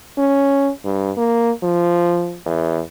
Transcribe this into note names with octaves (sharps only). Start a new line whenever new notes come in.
C#4
G2
A#3
F3
E2